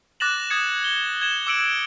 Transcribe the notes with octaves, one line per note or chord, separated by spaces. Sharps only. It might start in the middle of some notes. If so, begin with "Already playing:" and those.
D6 F#6 A6 A#6 E7 F#7
D#6 G#6 A6 C#7
G7
G#6 E7
D6 E6 C#7 D7 F#7